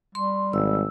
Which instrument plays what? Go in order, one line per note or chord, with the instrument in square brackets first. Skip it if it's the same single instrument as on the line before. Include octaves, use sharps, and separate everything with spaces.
[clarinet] G3 [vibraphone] C6
[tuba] G#1 [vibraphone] E6